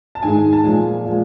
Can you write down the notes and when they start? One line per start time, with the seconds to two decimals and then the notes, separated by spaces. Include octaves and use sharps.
0.15 A5
0.23 G#2 D#3 G#3 G#5
0.53 A5
0.64 A#2 F3 G#3 G#5
1.05 A#2 F3 G#3